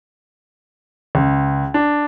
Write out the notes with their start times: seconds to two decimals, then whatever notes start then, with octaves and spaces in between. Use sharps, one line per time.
1.15 C#2
1.74 D4